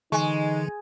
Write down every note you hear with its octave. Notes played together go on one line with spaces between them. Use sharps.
D3 E3 G#3 D#4 G#5 C#6